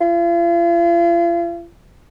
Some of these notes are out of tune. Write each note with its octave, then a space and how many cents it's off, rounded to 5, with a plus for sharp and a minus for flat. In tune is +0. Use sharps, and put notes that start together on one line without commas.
F4 -40